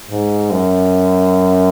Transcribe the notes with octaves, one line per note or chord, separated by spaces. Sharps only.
G#2
F#2